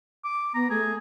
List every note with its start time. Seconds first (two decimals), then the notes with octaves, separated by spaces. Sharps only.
0.25 D6
0.54 B3 A#5
0.70 A3 G#4